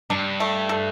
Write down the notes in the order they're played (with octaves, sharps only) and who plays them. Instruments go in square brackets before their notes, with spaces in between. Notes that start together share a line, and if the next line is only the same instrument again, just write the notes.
[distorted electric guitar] G2 [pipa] D4
[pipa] A3
A4